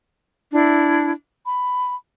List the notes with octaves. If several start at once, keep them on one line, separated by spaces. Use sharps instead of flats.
D4 E4
B5